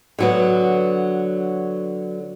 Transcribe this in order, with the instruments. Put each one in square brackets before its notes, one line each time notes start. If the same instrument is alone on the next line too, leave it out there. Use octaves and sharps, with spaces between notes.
[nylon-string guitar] D3 F#3 B3